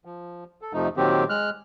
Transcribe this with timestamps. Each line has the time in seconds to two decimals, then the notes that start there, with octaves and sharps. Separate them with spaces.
0.05 F3
0.62 A4
0.73 F2 C3 F3 A3 D#4
0.97 A#2 D#3 F#3 C4 G4
1.29 G#3 F6 F#6